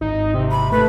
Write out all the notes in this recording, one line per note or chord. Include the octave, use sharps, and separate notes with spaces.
G#1 D#4
C3
B5
A3 B4